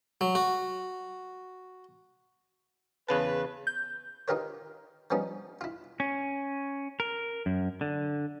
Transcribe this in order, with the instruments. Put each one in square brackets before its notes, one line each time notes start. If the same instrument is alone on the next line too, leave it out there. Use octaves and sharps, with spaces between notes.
[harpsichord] F#3
F#4
[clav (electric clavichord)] E2 C#3 A5 [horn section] B4
[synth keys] G6
[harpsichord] D#4 F4 G4 A#4 B4 C#5
F3 G3 B3 C#4 D#4
E4 F4
[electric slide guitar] C#4
A#4
F#2
D3